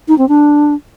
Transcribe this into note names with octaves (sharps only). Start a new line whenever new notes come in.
D#4
C4
D4